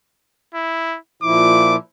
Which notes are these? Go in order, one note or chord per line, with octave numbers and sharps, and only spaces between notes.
E4
A#2 F3 E4 D6